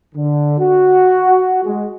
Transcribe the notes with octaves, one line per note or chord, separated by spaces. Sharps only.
D3
F#4
G#3